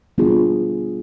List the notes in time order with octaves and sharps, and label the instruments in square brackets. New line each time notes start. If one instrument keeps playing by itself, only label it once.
[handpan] G3 B3 D4 F4 G#4